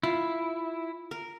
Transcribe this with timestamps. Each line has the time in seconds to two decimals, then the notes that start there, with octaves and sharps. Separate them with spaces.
0.03 E4 F4
1.11 A#4